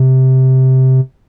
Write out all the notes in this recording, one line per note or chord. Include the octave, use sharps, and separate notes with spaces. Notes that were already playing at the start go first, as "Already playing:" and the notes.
Already playing: C3